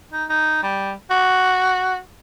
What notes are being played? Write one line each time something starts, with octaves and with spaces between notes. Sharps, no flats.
D#4
D#4
G3
F#4